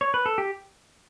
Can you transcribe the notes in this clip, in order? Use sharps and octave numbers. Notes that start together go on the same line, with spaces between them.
C#5
B4
A4
G4